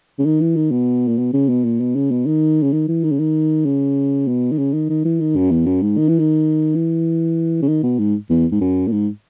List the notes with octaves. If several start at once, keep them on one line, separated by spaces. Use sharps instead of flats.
C#3
D#3
E3
D#3
B2
A#2
B2
C#3
B2
A#2
B2
C#3
B2
D#3
C#3
D#3
E3
D#3
C#3
D#3
C#3
B2
D#3
C#3
D#3
D#3
E3
D#3
F#2
E2
F#2
G#2
D#3
E3
D#3
E3
C#3
D#3
B2
G#2
E2
G#2
F#2
A#2
G#2